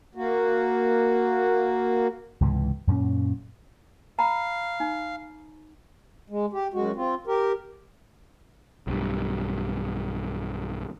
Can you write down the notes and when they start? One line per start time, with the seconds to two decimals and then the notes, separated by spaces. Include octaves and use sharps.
0.15 A#3 F#4
2.40 C#2 G#2 C3 E3
2.87 F#2 A#2 A#3 C#4
4.19 F5 A#5 B5
4.80 D#4
6.30 G#3
6.53 G4
6.74 F#2 G#3 F#4
6.96 C4 F4
7.27 G4 A#4
8.87 B1 G2